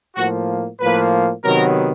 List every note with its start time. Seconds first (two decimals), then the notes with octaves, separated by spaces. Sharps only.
0.16 A2 F3 A#3 F#4
0.80 A2 F3 A#3 B4
1.44 C3 D#3 F#3 B3 A#4